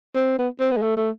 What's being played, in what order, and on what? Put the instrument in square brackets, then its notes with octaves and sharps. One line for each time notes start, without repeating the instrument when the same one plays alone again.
[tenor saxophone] C4
B3
C4
B3
G#3
A3
A3